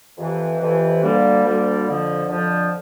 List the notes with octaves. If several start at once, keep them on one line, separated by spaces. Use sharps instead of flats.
F2 C3 E3
F2 C3 E3
D2 D3 G3 A#3
D2 D3 G3 A#3
F2 D3 F3
F2 D3 F3